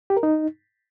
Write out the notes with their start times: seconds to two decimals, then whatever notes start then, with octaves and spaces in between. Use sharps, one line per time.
0.10 G4
0.17 A#4
0.23 D#4